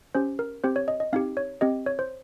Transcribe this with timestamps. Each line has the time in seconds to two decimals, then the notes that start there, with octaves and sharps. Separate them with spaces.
0.15 C#4 G4 C5
0.39 A#4
0.64 C4 G4 C5
0.76 C#5
0.88 D#5
1.00 D#5
1.13 C4 D#4 G4 F5
1.37 C#5
1.61 C4 G4 D#5
1.86 C#5
1.99 C5